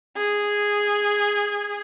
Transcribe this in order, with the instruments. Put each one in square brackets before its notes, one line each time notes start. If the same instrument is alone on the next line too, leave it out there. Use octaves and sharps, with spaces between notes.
[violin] G#4